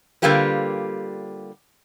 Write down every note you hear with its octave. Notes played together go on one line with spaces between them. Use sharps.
D3 G3 A#3 F4 G4 B4